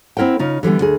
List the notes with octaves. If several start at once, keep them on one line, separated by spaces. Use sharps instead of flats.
C4 E4 A#4 F#5 G5
C#3 D#4 F4
D3 E3 G3 B3
D2 G#4